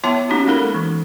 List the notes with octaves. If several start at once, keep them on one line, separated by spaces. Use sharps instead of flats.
B3 E4 C#5 E5 A5 D6
A#3 C#4 D#4 F#4 G4
G#3 A#3 D#4 A4 A#4 B5
E3